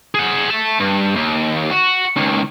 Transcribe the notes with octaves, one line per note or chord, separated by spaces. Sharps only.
G#4 F#5
E5 A5
G2
D#2
F#4
C#2 D#3